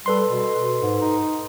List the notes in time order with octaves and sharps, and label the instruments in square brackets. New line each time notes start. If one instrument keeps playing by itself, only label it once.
[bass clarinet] G3 [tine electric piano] A4 B4 C6
[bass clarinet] B2
G#2
D#4